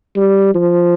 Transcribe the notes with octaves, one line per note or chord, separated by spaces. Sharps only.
G3
F3